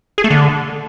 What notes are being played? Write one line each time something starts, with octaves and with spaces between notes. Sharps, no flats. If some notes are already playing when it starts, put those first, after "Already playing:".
G#4
A3
D3